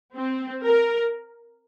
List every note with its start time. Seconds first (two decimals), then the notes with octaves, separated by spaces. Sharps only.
0.16 C4
0.64 A#4